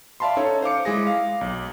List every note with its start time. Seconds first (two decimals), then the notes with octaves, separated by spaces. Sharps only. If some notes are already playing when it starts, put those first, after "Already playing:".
0.20 D5 E5 F5 A5 B5 C6
0.37 C#4 D#4 A4 C#5
0.62 C5 F5 D6 C#7
0.85 G#3 E4 G#4 A#6
1.07 F5
1.41 B1